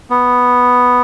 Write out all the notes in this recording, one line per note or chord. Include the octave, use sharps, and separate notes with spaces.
B3